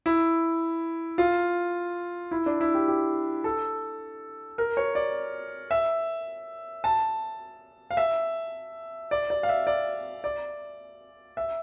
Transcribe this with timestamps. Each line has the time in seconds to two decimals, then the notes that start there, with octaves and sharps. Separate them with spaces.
0.06 E4
1.18 F4
2.31 E4
2.46 D4
2.61 E4
2.75 G4
2.88 G4
3.44 A4
4.58 A#4
4.77 C#5
4.95 D5
5.71 E5
6.84 A5
7.91 F5
7.97 E5
9.11 D5
9.30 D5
9.43 F5
9.49 E5
9.67 D5
10.24 D5
11.37 E5